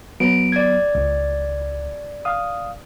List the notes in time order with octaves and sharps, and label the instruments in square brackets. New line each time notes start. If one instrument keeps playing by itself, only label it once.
[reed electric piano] F#3 B3 [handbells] D7
[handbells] D5 G#6
[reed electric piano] C#2
F5 D#6